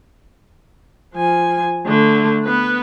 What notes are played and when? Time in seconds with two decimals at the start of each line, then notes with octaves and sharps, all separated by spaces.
1.15 F3 G#5
1.86 D3 A3
2.44 B3 B4